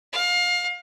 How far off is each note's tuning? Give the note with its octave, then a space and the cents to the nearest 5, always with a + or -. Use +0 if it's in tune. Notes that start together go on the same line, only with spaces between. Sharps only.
F5 +25